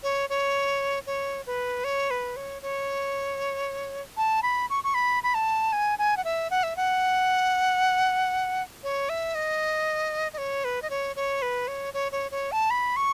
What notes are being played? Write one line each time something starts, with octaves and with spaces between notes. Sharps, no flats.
C#5
C#5
C#5
B4
C#5
B4
C#5
C#5
A5
B5
C#6
C#6
B5
B5
A5
G#5
G#5
F#5
E5
F#5
E5
F#5
C#5
E5
D#5
D#5
C#5
B4
D#5
C#5
C#5
B4
C#5
C#5
C#5
C#5
A5
B5
C#6